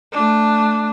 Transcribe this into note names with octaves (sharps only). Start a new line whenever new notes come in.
A3 D4